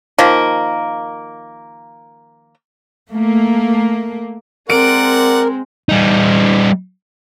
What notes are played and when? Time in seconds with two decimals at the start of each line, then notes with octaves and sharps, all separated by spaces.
0.18 D#3 F3 A#3
3.09 A3 A#3
4.70 G#3 C4 A#4 D5 F#5 D7
5.89 G3 D#4